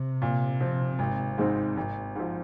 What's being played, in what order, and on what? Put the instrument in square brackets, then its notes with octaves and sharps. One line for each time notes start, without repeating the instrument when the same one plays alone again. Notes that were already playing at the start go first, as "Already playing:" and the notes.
Already playing: [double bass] C3
[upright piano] A#2
F3 C4
G#1
G#2 D#3 G#3 C4
G#1
G#2 F3